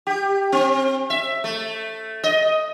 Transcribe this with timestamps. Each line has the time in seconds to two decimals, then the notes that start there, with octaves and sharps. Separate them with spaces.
0.07 G4
0.52 C4
1.10 E5
1.44 A3
2.24 D#5